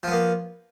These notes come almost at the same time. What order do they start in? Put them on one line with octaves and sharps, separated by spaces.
F3 B3 A#3